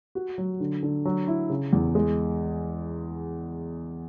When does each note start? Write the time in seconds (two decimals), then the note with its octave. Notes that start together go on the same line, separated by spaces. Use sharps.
0.15 F#4
0.38 F#3
0.60 D3
0.83 D3
1.05 F#3
1.28 E4
1.50 C#3
1.73 E2
1.95 G#3